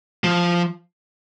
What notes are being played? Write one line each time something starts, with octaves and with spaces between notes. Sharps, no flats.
F3